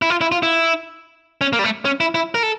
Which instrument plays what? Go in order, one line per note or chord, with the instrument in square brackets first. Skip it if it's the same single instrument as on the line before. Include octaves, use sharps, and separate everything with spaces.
[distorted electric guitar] E4
F4
E4
F4
E4
C#4
A#3
G3
A3
C#4
E4
E4
A#4
A4